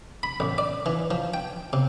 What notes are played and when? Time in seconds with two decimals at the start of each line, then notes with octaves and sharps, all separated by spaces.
0.23 B5
0.40 A1
0.58 D5
0.86 E3
1.11 F3
1.34 G5
1.73 C3